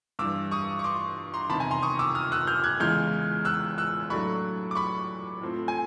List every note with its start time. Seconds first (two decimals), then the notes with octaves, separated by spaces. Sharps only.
0.19 G2 E3 G3 D6 E6
0.51 C#6 D#6
0.79 C#6
0.84 C6 D6
1.34 A#5 C6
1.49 E2 C3 D#3 A5 B5
1.60 G#5 A#5
1.71 A#5 C6
1.82 C#6 D#6
1.99 D6 E6
2.15 D#6 F6
2.32 E6 F#6
2.47 F6 G6
2.64 F#6 G#6
2.80 E2 C#3 E3 G#3 F6 G6
3.45 E6 F#6
3.78 E6 F#6
4.10 A2 F#3 A3 D4 B5 C#6
4.71 D6
4.75 B5 C#6
5.41 A2 F3 A3 C4
5.68 G#5